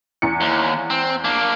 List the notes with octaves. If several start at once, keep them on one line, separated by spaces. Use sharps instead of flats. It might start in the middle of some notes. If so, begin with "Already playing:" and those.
E2 C#7
D#2
C4
A#3 D4